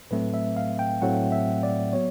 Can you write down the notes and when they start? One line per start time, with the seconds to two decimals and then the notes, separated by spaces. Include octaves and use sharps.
0.11 A2 F#3 A3 C4 B4
0.34 E5
0.57 F5
0.79 G5
1.02 A2 F#3 A3 C4 F#5
1.32 E5
1.63 D5
1.93 F#3 B3 C#5